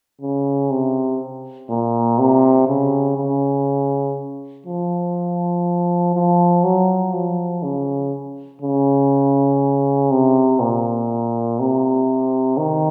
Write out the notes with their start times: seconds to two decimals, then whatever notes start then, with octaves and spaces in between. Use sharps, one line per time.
0.21 C#3
0.70 C3
1.70 A#2
2.19 C3
2.68 C#3
3.17 C#3
4.66 F3
6.14 F3
6.64 F#3
7.13 F3
7.63 C#3
8.61 C#3
10.11 C3
10.60 A#2
11.59 C3
12.58 D#3